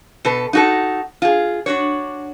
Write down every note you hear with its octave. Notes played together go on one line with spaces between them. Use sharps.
B2 A4 B4
D#4 F#4 A4
F4 G#4
D4 F#4 C#5